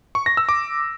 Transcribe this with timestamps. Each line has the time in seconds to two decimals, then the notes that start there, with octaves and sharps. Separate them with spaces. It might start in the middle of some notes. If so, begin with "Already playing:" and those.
0.15 C#6
0.26 A#6
0.37 E6
0.49 D6